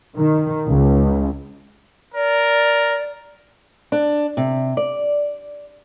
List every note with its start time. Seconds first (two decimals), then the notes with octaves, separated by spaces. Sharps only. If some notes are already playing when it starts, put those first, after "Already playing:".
0.16 D#3
0.68 C#2
2.15 A#4 D5
3.92 D4
4.37 C3
4.77 D5